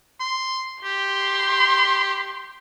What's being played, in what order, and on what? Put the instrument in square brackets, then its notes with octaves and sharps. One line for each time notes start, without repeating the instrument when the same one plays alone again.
[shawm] C6
[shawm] G4 [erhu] C6